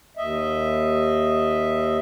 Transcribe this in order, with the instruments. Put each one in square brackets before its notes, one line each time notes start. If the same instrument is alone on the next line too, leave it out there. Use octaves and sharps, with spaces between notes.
[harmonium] D#2 D#5 E5